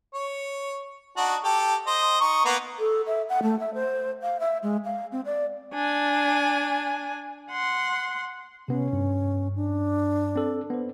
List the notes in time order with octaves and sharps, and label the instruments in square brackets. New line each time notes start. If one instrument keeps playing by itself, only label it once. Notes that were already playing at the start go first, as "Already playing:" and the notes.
[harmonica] C#5
D4 D#4 F#4
G4 A4
C5 D#5
D#4 C#6
A#3 B3 B4
[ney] A4
E5
F#5
A3
E5
C5
F5
E5
G#3
F5
C4
D5
[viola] D4 G#5
F#5 C6
[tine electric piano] C3 B3 [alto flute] C#4
[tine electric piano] G2
[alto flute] D4
[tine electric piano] C4 A4
B3 C5